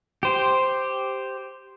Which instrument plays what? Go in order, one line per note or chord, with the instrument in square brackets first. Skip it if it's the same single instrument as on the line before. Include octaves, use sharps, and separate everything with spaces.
[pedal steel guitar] G4 C5